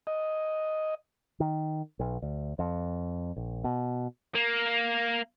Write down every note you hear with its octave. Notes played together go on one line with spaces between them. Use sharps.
D#5
D#3
B1
D2
F2
A#1
B2
A#3